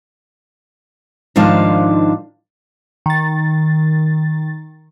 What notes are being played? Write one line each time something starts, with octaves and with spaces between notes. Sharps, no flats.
G#2 D#3 F3 D4 F5 A5
D#3 A6